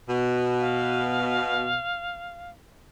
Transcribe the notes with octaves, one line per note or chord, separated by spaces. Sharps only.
B2
F5